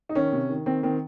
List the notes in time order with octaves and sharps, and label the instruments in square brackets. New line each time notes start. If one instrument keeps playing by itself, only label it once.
[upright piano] D#4
D#3 C#4
C3
D#3
D#3 C4
D#3 C4